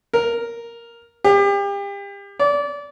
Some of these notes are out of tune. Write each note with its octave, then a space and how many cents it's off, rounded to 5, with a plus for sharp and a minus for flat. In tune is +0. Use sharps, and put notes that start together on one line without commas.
A#4 +0
G4 +35
D5 -25